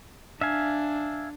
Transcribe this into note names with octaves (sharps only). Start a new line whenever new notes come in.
D4 E5 F5 G#5